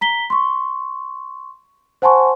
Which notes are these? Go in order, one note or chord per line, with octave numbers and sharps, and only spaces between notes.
A#5 B6 G7
C6 C#6
C5 F#5 G#5 A5 C6 C#6